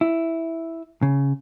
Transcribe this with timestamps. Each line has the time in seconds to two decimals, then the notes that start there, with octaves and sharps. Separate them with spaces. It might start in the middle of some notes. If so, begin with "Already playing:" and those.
0.01 E4
1.03 C#3